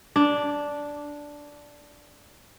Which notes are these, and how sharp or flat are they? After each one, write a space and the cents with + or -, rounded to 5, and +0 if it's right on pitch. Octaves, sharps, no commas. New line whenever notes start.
D4 -5